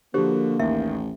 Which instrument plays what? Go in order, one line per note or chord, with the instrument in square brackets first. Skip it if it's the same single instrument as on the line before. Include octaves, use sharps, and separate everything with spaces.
[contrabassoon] D3 [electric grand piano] F3 F#4 [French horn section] A#3 [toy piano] G4 C5
[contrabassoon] A1 [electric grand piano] D#2 D#3 [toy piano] E5